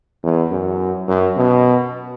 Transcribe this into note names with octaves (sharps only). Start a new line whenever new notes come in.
E2
F#2
F#2
B2